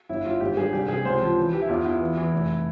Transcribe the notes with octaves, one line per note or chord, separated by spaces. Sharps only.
G1 E4
G1 F4
G#1 G4
G2 G#4
C2 G4
C3 G#4
C#2 C5
F3
E3
E3 G4
E4
E2 F4
E2 E4
E3
E3
F1